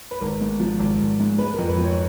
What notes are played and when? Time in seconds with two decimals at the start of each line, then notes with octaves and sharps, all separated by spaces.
0.11 B4
0.21 G#1 A#4
0.41 G#2
0.60 F3
0.80 G#1
1.00 G#1
1.20 G#2
1.38 G#3 B4
1.53 A#4
1.58 F2
1.69 B4
1.78 F3
1.84 C#5